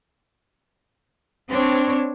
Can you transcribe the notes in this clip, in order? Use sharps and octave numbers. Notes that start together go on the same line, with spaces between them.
C4 D4 C#5